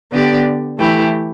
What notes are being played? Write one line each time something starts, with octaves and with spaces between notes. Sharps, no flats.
D3 B3 G4 D5
E3 A3 E4 G4